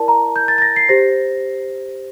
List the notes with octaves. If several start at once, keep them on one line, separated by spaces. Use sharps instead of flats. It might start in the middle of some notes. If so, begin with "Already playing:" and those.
Already playing: E4 A#4 D5 A5
A#5
G6
A6
A6
A#6
C7
G4 C5 A#6